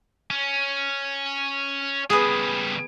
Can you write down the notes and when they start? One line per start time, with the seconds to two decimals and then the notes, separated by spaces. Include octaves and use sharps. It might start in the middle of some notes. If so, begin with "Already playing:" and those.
0.31 C#4
2.10 C#3 G3 B3 G#4